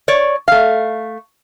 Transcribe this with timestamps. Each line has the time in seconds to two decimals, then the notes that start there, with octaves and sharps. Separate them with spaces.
0.08 C#5 D5
0.48 A3 F5